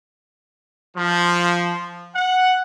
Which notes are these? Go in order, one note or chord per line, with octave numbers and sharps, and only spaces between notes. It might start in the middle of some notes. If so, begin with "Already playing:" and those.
F3
F#5